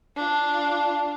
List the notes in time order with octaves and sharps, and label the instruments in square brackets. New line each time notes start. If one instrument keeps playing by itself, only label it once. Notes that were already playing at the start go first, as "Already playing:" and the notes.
[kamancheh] D4 F4